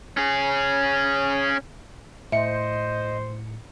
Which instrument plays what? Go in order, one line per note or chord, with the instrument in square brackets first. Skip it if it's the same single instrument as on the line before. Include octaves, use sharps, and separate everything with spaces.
[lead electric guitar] C#4 G#4
[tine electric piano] A2 C#7 [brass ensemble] C5 [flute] D#5 [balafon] E5